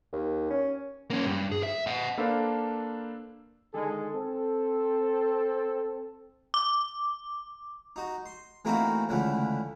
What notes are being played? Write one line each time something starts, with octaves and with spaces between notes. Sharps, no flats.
D#2
C#4
A#3 C#4
G2
G#4
E5
D#5 F#5
A#3 D4 A4 B4 C5 F5
D3 D#3 G#3 G#4 A4
C4 A4
D6
D#4 F#4
C6
E3 A3 A#3 C4 D#4 F#4
C#2 D3 E3 A3